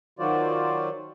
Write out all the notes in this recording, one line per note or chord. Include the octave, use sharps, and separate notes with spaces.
D#3 F#3 F4 F#4 C5 D5